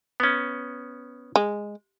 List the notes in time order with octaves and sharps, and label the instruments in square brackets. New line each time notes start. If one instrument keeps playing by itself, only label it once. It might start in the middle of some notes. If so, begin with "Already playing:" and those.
[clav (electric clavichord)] B3 C#4
[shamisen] G#3